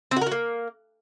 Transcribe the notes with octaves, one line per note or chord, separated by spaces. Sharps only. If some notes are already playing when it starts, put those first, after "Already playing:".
C4
F#4
A#4
F#4
A#3